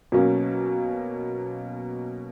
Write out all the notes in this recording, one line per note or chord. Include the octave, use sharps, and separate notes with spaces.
B2 F#3 A#3 C#4